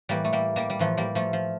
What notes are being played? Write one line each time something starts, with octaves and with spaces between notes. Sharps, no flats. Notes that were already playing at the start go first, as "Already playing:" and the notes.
A2 E3 G3 A#3
A3
G3 A#3
G3 A#3
G3
A2 E3 F3 A3
G3 A#3
F3 A3
F3